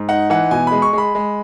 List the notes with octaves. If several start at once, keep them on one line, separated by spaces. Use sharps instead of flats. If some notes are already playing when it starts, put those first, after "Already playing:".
Already playing: G#2
D#4 F#5
E3 F#5
B2 G#5
G#3 B5
C#6
G#3 B5
G#3